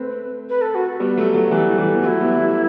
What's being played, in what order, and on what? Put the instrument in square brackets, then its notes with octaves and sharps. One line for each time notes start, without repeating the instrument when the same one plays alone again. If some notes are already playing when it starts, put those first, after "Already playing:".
Already playing: [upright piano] A3 C4 [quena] B4
[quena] B4
A4
F#4
[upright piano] G3 B3
F#3 A3
F#3 A3
E3 G3
E3 G3
B3
[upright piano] F#3 A3 [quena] E4 F#4
[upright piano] G3 B3
F#3 A3